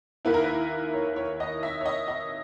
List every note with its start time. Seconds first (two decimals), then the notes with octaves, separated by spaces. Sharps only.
0.25 D#2 D#3 A#3 E4 B4
0.34 A#4
0.44 B4
0.94 C#5
1.16 C#5
1.40 D#5
1.63 E5
1.81 C#5
1.86 D#5
2.08 D#5